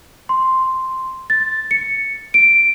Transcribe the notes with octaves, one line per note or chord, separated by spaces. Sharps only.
C6
A6
C#7
D7